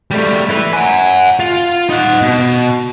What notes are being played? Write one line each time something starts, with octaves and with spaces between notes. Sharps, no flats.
G3 A3
E4 B4
F#5 G#5
F4
D#4 F#5
B2